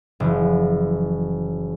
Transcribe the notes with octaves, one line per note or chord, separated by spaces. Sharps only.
F#1 E3 F3